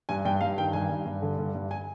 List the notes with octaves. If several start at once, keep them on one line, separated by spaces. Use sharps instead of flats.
G2 G#5
G2 G5
G2 F5
D#3 G5
G2 G#5
G2
G2
D3
G2
G2
G#5